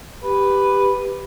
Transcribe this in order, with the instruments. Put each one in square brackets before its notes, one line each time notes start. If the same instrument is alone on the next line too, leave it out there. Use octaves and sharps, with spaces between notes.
[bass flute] G4 [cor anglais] B4